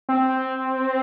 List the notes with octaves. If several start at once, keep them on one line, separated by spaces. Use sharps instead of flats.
C4